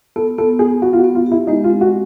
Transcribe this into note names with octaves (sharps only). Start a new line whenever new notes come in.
B3 A4
B3 A4
B3 G#4
B3 F#4
F4
F#4
B3
F4
G4
E4
G#3 D#4
F4
C4
F#4